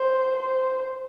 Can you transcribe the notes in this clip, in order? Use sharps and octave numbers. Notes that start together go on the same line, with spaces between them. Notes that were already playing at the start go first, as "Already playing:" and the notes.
Already playing: C5
C5